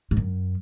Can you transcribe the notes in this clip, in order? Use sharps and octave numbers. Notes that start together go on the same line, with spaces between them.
G#2
F#2